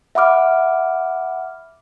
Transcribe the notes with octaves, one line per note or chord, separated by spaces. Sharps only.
E5 F#5 B5 D6 F6